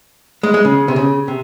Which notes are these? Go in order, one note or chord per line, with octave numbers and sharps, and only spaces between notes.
G#3
G#3
C#3
C3
C#3
C3